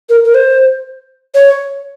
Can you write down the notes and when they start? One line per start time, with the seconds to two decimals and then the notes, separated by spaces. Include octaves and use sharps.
0.09 A#4
0.24 A#4
0.34 C5
1.34 C#5